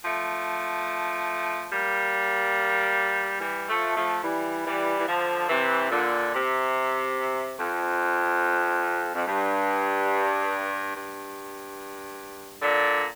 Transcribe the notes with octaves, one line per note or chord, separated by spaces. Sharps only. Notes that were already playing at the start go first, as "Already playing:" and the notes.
F3 A3
G3 A#3
E3 G3
F3 A3
F3 A3
E3 G3
E3 G3
E3
D3 F3
C3 E3
A#2 D3
C3
F2
F2
G2
G2
A#2 D3